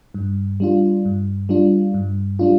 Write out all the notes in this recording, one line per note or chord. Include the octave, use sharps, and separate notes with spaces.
G2
G3 D4 F4
G2
G3 D4 F4
G2
G3 D4 F4